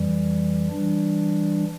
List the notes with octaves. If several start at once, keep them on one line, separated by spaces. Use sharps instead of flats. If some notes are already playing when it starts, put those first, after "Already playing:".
Already playing: F2 E3 G3
E3 G3 D4